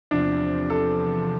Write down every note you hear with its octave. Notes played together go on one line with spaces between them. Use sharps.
E2 C3 F3 D4
A4